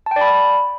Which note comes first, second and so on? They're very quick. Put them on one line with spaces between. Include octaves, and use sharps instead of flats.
A5 G5 D5 B5